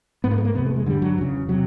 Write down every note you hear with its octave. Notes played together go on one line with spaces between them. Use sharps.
G#2 B3
A#3
A3
A#3
E2 C3 B3
A3
G#3
G2 D3 G3
F#3
E2 C#3
C3 F#3